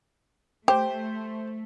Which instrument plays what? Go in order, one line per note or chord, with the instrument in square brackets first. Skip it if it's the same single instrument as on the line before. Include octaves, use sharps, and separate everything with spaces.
[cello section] A3 [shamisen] G4 [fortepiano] C5 [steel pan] G5